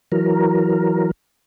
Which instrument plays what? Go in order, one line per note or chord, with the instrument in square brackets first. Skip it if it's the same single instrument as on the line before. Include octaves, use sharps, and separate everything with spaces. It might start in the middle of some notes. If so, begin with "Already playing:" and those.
[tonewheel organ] E3 F#3 A#4